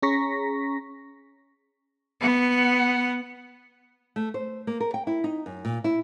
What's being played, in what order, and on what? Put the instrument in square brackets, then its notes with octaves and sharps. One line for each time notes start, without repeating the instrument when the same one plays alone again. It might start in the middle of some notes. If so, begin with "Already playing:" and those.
[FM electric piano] C#4 G#4 A#5 C#6 A#6 B6
[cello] B3 F#5
[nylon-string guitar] A3
C5
A#3
A#4
G5
E4
D#4
F#2
A#2
E4